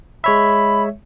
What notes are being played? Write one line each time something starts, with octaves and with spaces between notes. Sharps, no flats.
G#3 C#5 E5 B5